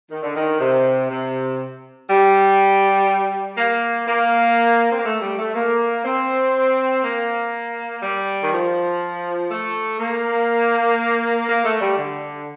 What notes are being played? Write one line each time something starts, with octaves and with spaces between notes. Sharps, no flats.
D#3
D3
D#3
C3
C3
G3
A#3
A#3
C4
A#3
A3
G3
A3
A#3
C4
A#3
G3
D#3
F3
A3
A#3
A#3
A3
G3
D3